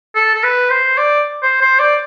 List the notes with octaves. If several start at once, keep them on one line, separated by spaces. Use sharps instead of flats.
A4
A4
B4
C5
D5
C5
C5
D5